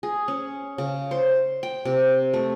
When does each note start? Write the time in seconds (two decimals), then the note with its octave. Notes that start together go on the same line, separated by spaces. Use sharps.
0.03 G#4
0.28 C#4
0.78 C#3
1.11 C5
1.63 G5
1.85 C3
2.34 A3